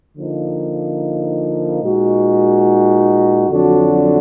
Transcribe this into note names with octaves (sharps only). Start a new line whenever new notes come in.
D3 F3 A#3 D#4
A#2 G#3 D#4 F#4
F2 D3 F#3 D4 F#4